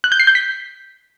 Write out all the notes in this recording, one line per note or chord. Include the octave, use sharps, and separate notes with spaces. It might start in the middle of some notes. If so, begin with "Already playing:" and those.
F#6
G6
C7
G6
B6